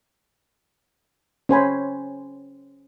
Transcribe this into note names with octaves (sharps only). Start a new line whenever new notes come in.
C#4 C5 G#5 B5